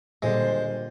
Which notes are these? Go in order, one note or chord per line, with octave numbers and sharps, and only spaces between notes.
D#1 A#2 D3 G3 G#3 C5 A6